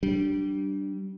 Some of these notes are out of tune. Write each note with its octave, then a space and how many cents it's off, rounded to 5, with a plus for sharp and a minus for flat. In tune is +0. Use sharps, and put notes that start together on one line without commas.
G3 -25 D4 +0